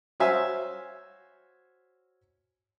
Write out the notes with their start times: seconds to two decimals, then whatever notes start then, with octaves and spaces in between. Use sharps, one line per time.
0.20 F#4 C5 C#5 E5 F5 G#5